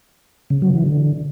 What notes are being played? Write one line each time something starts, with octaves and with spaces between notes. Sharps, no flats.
C#3
F#3
E3
D3